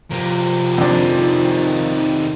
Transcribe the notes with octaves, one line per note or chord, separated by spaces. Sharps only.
C3 F3 A#3
F2 D#3 D4